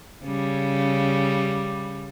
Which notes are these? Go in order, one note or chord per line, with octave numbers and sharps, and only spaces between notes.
C#3 G3